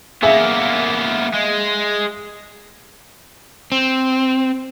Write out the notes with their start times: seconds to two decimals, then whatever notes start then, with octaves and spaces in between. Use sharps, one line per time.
0.23 A#3 B3 G#4 E5 F5
1.33 G#3
3.72 C4